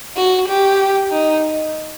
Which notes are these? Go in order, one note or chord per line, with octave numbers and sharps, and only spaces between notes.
F#4
G4
D#4